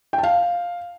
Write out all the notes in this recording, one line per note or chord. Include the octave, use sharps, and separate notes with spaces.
G5
A5
F5